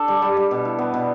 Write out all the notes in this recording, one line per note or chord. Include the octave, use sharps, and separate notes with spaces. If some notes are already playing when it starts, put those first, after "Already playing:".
Already playing: D4 A4
G3
G3
G3
B2
E4
B3
B2